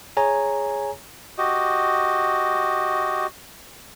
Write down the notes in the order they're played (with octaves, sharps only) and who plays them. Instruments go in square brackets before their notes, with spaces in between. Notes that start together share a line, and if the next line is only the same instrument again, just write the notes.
[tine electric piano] G#4 C#5 G#5 A#5
[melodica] F#4 G4 D#5